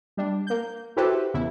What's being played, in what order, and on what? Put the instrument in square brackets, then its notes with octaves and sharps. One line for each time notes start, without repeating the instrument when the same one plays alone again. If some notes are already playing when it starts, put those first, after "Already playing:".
[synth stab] G3 D4
A#3 G6
E4 F#4 G4 A4 B4 C5
E2 C#3 E4